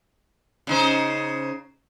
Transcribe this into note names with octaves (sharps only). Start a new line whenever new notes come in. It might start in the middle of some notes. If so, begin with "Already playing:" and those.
C#3 D#4 C5